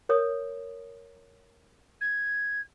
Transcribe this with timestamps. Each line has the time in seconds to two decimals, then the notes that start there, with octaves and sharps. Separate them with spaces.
0.09 A#4 C#5 D#6
2.01 G#6